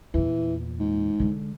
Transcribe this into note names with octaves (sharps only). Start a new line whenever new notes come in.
E2 A#2 E3
G#2
D3 G#3